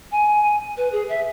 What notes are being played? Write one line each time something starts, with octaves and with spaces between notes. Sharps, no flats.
G#5
B4
G#4
E5